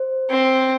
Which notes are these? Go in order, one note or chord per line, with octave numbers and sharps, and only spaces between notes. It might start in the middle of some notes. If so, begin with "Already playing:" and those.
Already playing: C5
C4